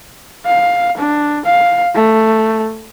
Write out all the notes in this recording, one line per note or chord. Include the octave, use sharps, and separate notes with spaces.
F5
D4
F5
A3